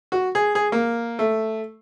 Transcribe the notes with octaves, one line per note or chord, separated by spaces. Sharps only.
F#4
G#4
G#4
A#3
A3